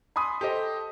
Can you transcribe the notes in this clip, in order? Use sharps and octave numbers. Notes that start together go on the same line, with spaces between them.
G#5 B5 C6 D#6
G4 A4 C5 D#5